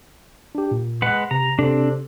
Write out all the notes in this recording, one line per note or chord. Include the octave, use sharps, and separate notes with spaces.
D4 G4
A#2
G#3 B4 F#5
C3 A#5
C3 C4 D4 A4